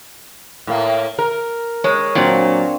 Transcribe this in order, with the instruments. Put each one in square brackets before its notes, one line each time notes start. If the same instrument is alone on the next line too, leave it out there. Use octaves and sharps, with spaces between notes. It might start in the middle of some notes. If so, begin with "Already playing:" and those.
[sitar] A2 A#3
A#4
[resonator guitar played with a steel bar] G#3 [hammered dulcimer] C#5
[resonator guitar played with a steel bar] A#2 F#3 [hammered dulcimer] C4 D4 F5